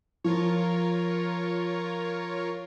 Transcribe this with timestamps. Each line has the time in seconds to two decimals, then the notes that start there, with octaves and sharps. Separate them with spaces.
0.24 F3 F4 A#4 C#5